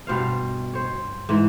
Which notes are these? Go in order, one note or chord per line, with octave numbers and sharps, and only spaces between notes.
G2 B2 C5 F5
C5 C#5
G#2 E3